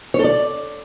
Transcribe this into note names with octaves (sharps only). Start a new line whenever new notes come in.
C#5
A4
D5